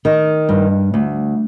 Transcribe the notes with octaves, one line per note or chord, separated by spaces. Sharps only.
D#3
G2
D2